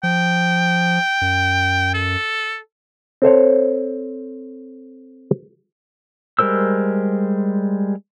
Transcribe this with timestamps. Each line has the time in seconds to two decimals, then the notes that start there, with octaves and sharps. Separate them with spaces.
0.03 F3 G5
1.21 F#2
1.94 A4
3.22 C4 A4 C5 C#5
6.39 G3 G#3 A#4 C5 E6